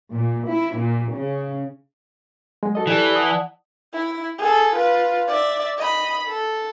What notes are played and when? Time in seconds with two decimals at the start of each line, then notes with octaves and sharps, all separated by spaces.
0.14 A#2
0.49 E4
0.79 A#2
1.15 C#3
2.63 F#3 G#3
2.75 F#4 A4 D#5
2.87 E3 E4 G4 A4 D5
3.16 D5 F#5 A5 D#6
3.93 E4
4.39 G#4 A4
4.76 F4 B4
5.28 D5 E5
5.77 D#5 B5
6.27 A4